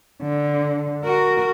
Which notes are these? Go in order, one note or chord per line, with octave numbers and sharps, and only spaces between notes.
D3
F#4 A#4